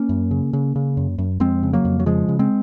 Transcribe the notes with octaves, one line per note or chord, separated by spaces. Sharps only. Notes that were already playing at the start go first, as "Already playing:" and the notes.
Already playing: A#3 C#4
F#2
C#3
C#3
C#3
F#2
F#2
F2 G#3 C4
C#3
F#3 A#3
F2
F#3
C#3 F3 G#3
C#3
G#3 C4